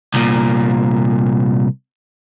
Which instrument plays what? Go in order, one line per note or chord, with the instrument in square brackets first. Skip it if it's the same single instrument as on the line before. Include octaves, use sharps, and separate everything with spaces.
[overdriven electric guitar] C2 A#2